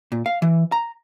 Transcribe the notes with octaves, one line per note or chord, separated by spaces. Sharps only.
A#2
F5
E3
A#5